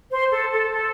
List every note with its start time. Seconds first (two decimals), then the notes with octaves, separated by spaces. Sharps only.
0.11 C5
0.31 A4
0.52 A4
0.72 A4